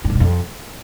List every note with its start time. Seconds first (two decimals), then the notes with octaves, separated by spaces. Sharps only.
0.04 G2
0.10 A2
0.15 B2
0.20 F2